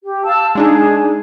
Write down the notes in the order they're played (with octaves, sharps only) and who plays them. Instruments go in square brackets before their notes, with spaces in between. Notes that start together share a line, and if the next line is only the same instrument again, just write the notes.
[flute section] G4
F5 A5 E6
[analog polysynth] G#3 D4 D#4 [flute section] G#4